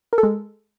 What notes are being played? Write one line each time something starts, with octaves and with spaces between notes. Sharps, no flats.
A#4
A4
G#3